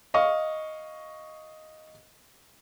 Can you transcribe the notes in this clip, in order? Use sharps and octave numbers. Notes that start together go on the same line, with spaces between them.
D#5 F5 C#6